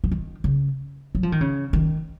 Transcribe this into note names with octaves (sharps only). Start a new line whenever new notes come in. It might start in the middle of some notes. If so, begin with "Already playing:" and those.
F3
D#3
C#3
F#3
F3
D#3
C#3
D#3